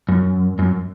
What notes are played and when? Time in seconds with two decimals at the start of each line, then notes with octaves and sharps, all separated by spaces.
0.09 F#2
0.59 F#2